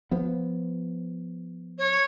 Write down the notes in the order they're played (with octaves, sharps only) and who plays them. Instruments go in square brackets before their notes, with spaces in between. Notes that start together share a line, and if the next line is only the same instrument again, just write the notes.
[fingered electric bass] F3 B3
[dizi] C#5